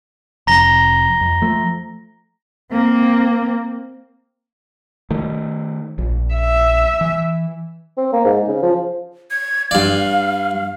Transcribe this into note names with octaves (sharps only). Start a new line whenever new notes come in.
F1 F2 A#5 A#6 G7
F2
F3 A3
A#3 C4
D#3 A3
A#1
E5
E3
C4
A#3
G#2
C#3
F3
G#6
G2 D5 F5